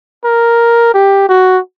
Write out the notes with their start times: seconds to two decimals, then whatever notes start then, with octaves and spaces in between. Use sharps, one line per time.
0.24 A#4
0.94 G4
1.29 F#4